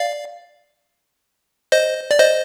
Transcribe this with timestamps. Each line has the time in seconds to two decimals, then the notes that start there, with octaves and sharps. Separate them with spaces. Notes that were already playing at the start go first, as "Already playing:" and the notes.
Already playing: D5 F5
1.72 C5 D#5
2.11 D5
2.19 C5 D#5